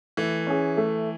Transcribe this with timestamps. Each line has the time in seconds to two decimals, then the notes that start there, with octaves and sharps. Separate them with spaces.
0.17 E3 A3
0.47 C#4 G#4
0.77 A3